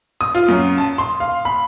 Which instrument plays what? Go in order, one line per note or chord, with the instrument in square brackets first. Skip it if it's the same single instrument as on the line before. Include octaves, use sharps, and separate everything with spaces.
[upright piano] D#6
F4
F#2
A5
C6
F5
B5